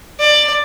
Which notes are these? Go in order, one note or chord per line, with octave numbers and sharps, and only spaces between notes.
D5